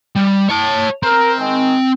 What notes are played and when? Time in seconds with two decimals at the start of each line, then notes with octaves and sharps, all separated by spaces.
0.16 G3
0.50 C#5 A5
1.03 C4 A#4
1.38 D#3 G#3